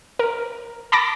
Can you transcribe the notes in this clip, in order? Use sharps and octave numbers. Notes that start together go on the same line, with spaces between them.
A#4
A5 B5 D6 A#6